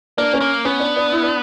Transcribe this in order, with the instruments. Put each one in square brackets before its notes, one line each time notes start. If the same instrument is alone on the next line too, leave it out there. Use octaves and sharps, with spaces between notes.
[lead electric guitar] A#3 [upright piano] D4
[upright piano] C#4
[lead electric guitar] A#3
[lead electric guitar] B3 [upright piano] C#4
[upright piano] D4
D4
E4
D4